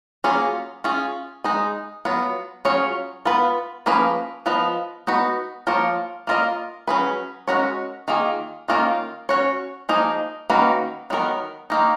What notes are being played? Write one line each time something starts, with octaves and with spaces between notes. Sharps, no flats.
F#3 A#3 C#4 F4 G#4
C#4 F4 G#4
G#3 D#4 G#4
F#3 B3 F4
F#3 C#4 F4 G#4 C#5
B3 F4 B4
F3 A#3 C#4 G#4 B4
F3 B3 F4 B4 D#5
B3 D#4 F#4 B4
F3 A#3 F4 A#4 C#5
A#3 F4 A#4 D#5
F#3 C#4 G#4 B4
G#3 C#4 F#4 A#4 C#5
D#3 A#3 F4 G#4
D#3 A#3 C#4 F4 A#4
C#4 F#4 C#5
F3 A#3 D#4 G#4 D#5
D#3 A#3 C#4 F#4 B4
D#3 F#3 B3 F#4 A#4
D#3 A#3 D#4